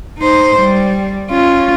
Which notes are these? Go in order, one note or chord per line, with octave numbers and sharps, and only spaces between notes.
D#4 C5
G3
C#4 F4